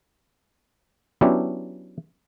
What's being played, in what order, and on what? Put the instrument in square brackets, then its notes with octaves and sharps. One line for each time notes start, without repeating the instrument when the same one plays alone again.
[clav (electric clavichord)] F#3 B3 C#4 D4 E4 G4